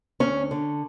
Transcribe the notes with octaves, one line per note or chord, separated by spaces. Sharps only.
D2 C#4
D3